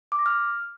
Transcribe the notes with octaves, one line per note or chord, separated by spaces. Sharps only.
D6
A#6
F6